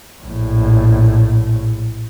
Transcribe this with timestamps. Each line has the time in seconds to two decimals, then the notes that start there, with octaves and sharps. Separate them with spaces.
0.22 A#1 A2